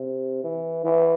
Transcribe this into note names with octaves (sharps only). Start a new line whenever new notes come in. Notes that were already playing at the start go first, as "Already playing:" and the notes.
Already playing: C3
E3
E3